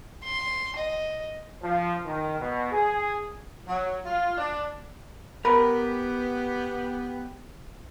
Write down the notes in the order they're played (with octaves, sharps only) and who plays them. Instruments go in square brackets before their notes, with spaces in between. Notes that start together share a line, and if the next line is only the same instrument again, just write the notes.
[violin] C6
D#5
[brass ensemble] F3
D#3
B2
G#4
[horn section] F#3
F4
D4
[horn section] B3 G4 [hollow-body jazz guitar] A#4 B5